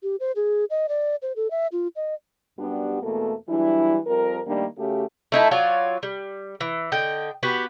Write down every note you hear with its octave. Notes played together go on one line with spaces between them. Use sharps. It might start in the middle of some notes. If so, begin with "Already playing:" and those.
G4
C5
G#4
D#5
D5
C5
A4
E5
F4
D#5
F#2 G3 B3 D4 F#4 G4
E2 B2 A3 A#3 A4
E3 F#3 G3 D4 E4
F2 F3 G3 A#4
D#3 G3 A3 A#3 D4
C#3 A3 F#4 G4
A3 D#4 E4 A5
F#3 F4 C#5 D5
G3
E3
D3 D#5 G5
B3 F#4 G4